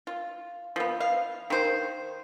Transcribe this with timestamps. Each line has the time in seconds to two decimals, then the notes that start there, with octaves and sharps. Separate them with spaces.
0.07 F4
0.76 F3 B3
1.00 F5
1.50 D#3 C5